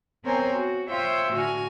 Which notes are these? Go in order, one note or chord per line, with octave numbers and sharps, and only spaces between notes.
B3 C4 A#4 C5 C#5 G#5
F#4
F4 C5 C#5 E5 F5 G5
A2 D3 F#4 G#5 F6